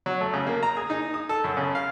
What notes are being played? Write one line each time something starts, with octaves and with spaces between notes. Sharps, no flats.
F#3
A3
C#3
A#3
A#5
G#4
D#4
D#6
A4
F#2
C#3
F5